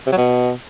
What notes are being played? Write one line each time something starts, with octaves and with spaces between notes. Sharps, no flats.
C3
F#3
B2